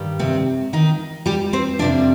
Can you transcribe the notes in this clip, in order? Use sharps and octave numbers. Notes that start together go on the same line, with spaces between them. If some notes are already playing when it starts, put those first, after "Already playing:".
Already playing: G2 D#3 G3
C3 C4
D#3 D#4
G3 G4
C4 C5
F2 C3 G3 D4 D5